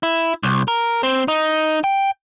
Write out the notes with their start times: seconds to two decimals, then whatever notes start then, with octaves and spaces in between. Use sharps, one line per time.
0.03 E4
0.43 C2
0.68 A#4
1.03 C4
1.28 D#4
1.84 G5